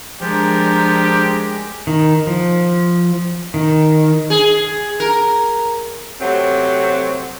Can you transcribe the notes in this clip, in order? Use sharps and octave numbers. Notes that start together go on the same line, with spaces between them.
F3 G#3 D4 G4 A#4
D#3
F3
D#3
G#4
A#4
C3 F#3 A3 C4